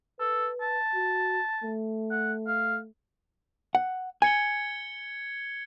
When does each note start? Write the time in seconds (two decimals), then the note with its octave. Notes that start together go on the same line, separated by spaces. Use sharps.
0.20 A4 B4
0.61 A5
0.95 F#4
1.64 A3
2.11 F#5
2.47 F5
3.75 F#5
4.22 G#5 G#6 C#7 G7